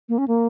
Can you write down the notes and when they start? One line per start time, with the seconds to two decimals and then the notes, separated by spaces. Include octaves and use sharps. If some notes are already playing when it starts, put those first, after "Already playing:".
0.09 A#3
0.18 C#4
0.28 A#3